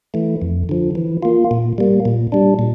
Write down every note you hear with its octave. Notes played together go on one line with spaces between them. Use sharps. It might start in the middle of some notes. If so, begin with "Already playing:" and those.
E3 A3
F2
D3 F3
E3
A#3 F4
A#2
G3 A#3
A#2
G3 D4
A#2